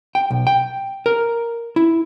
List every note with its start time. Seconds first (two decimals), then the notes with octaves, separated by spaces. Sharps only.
0.15 G5
0.30 B1
0.47 G5
1.06 A#4
1.76 E4